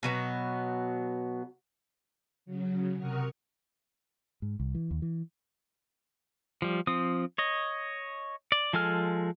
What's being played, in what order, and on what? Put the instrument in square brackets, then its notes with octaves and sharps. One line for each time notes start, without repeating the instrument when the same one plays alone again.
[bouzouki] B2 F#3 B3
[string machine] C#3 F#3
C3 A#4 F#5 C#6 D#6 F6
[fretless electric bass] G#2
C2
E3
D#2
E3
[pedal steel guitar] F3 G3
F3 C4 D#6
C#5 D#5
D5
F3 G#3 A4 G#5 F6